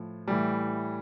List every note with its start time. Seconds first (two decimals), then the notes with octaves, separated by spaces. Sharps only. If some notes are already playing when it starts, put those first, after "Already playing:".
Already playing: A2 F3
0.28 A2 E3 G3